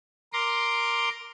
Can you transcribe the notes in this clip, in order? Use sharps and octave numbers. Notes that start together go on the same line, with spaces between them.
A#4 A#5 C6 D6